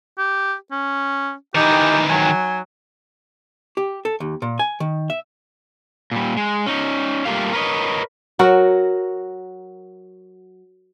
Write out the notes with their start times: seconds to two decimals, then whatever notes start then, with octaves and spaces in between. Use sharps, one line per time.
0.18 G4
0.71 C#4
1.55 D#3 E3 D#4 G4
2.10 F#3 G#5
3.77 G4
4.05 A4
4.20 D#2
4.42 A#2
4.59 G#5
4.80 D#3
5.10 E5
6.11 A#2 G3
6.37 G#3
6.66 C#4 D#4
7.25 G3 A3 A#3 F4 G4 F5
7.53 A#4 B4 C#5 D#5
8.39 F#3 F#4 A#4